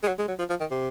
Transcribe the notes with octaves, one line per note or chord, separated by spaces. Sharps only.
G#3
F#3
G#3
F#3
F3
F3
D#3
C3